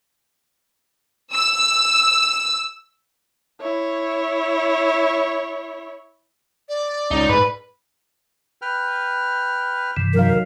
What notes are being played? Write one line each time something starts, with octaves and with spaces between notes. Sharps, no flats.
E6
E4 C#5
D5
C#2 D#4
G#2 B4
B4 G5 F6
G2 C3 E3
F#3 D#4 A#4 F5